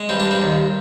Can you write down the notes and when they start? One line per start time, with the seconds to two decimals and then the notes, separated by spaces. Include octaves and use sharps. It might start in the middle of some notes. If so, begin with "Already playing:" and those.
Already playing: G#3
0.09 G2 C4
0.20 D4
0.26 G2
0.31 C4
0.42 D#2